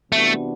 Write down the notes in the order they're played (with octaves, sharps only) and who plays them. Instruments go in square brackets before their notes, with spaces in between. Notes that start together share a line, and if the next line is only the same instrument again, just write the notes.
[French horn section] C3 E3 B3 D4 F#4 [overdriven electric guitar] A3